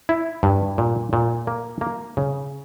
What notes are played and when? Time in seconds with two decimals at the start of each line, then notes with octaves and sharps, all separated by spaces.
0.09 E4
0.43 G2
0.78 A#2
1.13 A#2
1.47 A#3
1.81 A#3
2.17 C#3